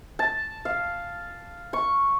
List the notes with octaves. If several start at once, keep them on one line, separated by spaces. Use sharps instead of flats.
A5
F5
C#6